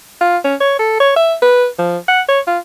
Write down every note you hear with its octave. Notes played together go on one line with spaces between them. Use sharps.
F4
C#4
C#5
A4
C#5
E5
B4
F3
F#5
C#5
F4